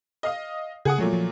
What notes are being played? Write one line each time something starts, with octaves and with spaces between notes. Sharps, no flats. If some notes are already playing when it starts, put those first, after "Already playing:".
D#5 F5 D#6
C#3 G#4 F#5 D#6
A#2 F3 F#3 G#3 A3
F3